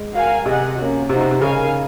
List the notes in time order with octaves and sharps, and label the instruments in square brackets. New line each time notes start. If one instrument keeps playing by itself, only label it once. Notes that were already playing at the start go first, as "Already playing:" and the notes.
Already playing: [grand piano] G#3
[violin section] F#4 A#4 F5 G#5
[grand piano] C3 [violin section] G#4 D#5 F#5
[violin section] A#3 C#4 F#4
[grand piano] C3 [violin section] D#4 F#4 C5
[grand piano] C3
C3
[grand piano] C#3 [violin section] D#4 A#4 F5 G#5